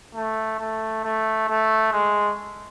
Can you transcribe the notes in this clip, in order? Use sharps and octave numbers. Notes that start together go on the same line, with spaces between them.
A3
A3
A3
A3
G#3